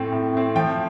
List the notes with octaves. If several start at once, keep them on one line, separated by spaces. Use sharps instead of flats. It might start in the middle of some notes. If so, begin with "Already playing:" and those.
Already playing: A2 A3 C4
A2
A3 C4
F3 G5